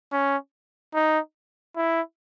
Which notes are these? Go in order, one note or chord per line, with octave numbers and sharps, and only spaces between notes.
C#4
D#4
E4